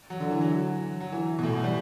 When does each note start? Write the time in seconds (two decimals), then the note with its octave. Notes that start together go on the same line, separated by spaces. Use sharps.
0.10 F#3
0.20 D3
0.30 E3
0.41 F#3
1.01 F#3
1.12 E3
1.39 B2
1.43 A2
1.53 B2
1.64 G3